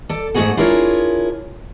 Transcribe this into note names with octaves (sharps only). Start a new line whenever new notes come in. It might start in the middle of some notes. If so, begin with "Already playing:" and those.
A4 D5
G#2 A3 D4 F#4 G#4 F#5
D4 E4 F4 G#4 A#4 C#5